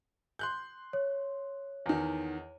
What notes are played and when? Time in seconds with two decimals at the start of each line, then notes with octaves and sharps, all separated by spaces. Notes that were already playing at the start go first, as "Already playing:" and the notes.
0.39 C6 F#6 G6
0.93 C#5
1.86 E2 D#3